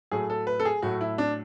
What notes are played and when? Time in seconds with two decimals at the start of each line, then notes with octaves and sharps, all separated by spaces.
0.11 A2 F#3 A3 G#4
0.30 A4
0.47 B4
0.60 A4
0.65 G#4
0.82 A2 F#3 A3 F#4
1.01 E4
1.18 D4